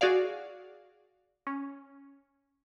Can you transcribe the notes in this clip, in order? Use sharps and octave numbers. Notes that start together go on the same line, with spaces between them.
F#4 G#4 D5 F5
C#4